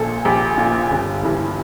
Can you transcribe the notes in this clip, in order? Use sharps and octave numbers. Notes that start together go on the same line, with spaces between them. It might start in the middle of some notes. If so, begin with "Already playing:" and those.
Already playing: A#1 A#2 A4
A#1 G4
A#2 F4
G1
G2 E3